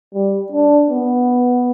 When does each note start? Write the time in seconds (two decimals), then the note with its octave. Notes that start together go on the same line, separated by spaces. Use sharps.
0.14 G3
0.52 D4
0.90 B3